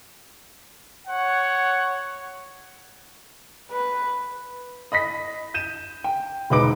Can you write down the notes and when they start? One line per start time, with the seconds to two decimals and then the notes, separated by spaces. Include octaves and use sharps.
1.08 C#5 F#5
3.71 B4
4.92 D#5 B5 A#6 B6
5.54 G6 D#7 E7
6.04 G5
6.50 E1 G#2 D#4 B4 D6 D7